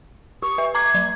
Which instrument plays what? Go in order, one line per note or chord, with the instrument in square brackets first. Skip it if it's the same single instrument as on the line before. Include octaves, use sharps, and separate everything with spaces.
[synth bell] G4 [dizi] C#6
[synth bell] B4 E5
[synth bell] A#5 D6 C7 [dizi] G#6
[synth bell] F#3